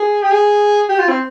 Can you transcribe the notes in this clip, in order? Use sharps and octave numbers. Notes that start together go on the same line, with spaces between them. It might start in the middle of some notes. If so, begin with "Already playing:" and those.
Already playing: G#4
G4
G#4
G4
F4
C4